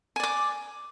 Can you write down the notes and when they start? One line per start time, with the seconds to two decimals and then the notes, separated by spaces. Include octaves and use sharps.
0.16 G#5
0.20 D5
0.23 D6